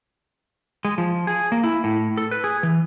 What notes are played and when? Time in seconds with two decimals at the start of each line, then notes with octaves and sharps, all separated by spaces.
0.85 G#3
0.98 F3
1.27 G#4
1.52 A#3
1.64 E4
1.84 A2
2.17 A4
2.31 B4
2.44 G#4
2.63 E3